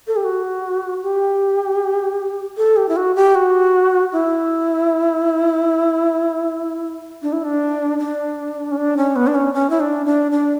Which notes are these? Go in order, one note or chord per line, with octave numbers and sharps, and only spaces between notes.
A4
G4
F#4
G4
A4
G4
E4
F#4
G4
F#4
E4
D4
E4
D4
D4
C#4
D4
C#4
B3
D4
C#4
C#4
E4
D4
D4
D4